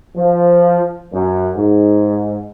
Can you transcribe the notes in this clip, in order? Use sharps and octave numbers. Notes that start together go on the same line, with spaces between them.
F3
F#2
G#2